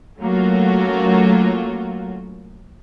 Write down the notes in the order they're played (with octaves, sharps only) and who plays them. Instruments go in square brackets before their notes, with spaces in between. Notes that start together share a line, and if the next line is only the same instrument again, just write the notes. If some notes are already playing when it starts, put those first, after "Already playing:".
[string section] F#3 A3 A#3 C#4 F4 F#4